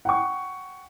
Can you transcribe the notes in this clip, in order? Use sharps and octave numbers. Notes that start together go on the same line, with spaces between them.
F#5 G5 C#6